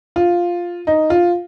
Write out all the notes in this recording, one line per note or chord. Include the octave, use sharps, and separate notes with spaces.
F4
D#4
F4